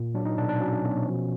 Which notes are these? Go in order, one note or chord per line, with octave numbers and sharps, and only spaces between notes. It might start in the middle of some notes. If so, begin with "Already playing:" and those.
Already playing: A#2
F#3 D4
D#4
B2 D4
D4
F#3 C#4
B2
F3